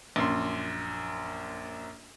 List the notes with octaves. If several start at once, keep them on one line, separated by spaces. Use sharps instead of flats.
A#1 F#2 C6